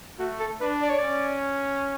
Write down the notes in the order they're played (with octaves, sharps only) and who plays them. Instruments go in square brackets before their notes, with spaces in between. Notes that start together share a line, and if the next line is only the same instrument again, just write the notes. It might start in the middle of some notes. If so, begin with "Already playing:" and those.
[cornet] A3 [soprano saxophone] F#4
[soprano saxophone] A4
[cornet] D4 [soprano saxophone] B4
[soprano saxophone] D5
C#5
[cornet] C#4 [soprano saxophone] D5